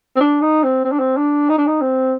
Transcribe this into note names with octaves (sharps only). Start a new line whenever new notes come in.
C4
D4
D#4
C4
C4
D4
C4
D4
D#4
D4
D#4
C4